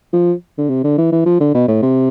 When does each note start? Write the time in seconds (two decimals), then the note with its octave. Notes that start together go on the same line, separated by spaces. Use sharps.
0.13 F3
0.58 D3
0.69 C3
0.84 D3
0.98 E3
1.12 E3
1.26 F3
1.40 D3
1.54 B2
1.68 A2
1.82 C3